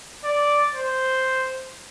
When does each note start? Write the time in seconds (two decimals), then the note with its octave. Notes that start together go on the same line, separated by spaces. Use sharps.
0.25 D5
0.74 C5